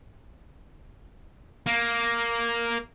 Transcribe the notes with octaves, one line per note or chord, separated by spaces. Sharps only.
A#3